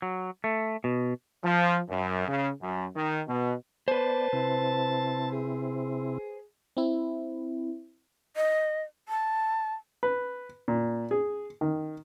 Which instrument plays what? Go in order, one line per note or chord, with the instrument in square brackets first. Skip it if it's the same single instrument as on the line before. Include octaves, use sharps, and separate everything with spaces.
[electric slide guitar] F#3
A3
B2
[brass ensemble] F3
F#2
C#3
F#2
D#3
B2
[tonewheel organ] B3 D5 [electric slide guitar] B4 C5 [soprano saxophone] A5
[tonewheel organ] C3 C4 E4
[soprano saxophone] G#4
[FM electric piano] C4 E4
[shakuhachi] D#5
A5
[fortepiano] B4
A#2
G#4
D#3